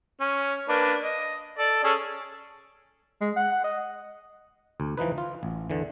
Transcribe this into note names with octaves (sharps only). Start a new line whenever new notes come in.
C#4
A#3 D4 B4
D#5
A4 D5
C#4 G#4 A4
G#3
F#5
D#5
D2
E3 F3 D#4 B4
F4
A1
E2 D3 E3